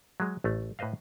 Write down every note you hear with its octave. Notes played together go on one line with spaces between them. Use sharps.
F#3 G#3
A1 A3
A2 B4 C5 D#5 F5